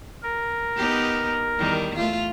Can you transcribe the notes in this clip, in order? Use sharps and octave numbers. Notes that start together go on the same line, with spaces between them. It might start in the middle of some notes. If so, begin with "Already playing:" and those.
A#4
B3 D#4 G4
E2 D#3 G3
A3 F4